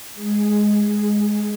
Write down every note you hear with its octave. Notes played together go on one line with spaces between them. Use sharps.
G#3 G#4